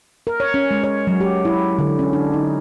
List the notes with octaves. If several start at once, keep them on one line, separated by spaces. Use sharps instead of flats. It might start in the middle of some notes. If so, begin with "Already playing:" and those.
A#4
C#5
C#4
G#3
C#5
F#3
G4
E4
D3
C#4
D4
D#4